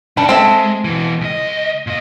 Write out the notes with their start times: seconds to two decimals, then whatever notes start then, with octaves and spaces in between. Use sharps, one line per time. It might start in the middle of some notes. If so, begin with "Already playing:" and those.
0.17 C3 G3 C#4 D4
0.29 G#3 C4 A4 E5
0.84 B2 E3
1.21 C#2 D#5
1.87 A#2 D#5